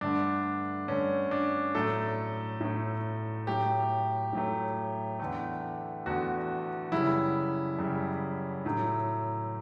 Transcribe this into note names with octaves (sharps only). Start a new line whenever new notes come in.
G2 D3 A3 D4
G2 D3 A3 C#4
D4
A2 F#3 A3 A4
A2 F#3 A3
A2 F#3 A3 G4
A2 F#3 A3
E2 D3 A3
E2 D3 A3 F#4
F#2 C#3 G3 E4
F#2 C#3 G3
A2 F#3 A3